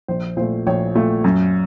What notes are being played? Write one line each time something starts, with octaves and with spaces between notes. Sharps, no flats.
A#1 C5
A#2 A3 C5
A#1 C#5
A#2 A3
F#2